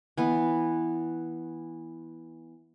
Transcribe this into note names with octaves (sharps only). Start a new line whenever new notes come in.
E3 B3